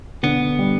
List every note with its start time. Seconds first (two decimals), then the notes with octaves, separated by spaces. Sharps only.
0.23 D3 B3
0.59 G3